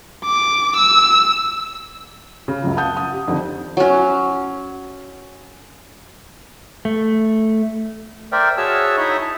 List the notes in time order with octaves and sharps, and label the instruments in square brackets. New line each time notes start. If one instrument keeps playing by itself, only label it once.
[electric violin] D6
E6
[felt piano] C#3
C#2 F#2 F3
F5 F#5 A5 D#6 G6
D#6
G4
F2 D3 D#3
[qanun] F#3 C#4
[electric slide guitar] A3
[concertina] A#4 C5 D5 E5 G5
F#4 G#4 C#5 E5 A5 E6
D#4 E4 C#5 D#5 E5 B5
A5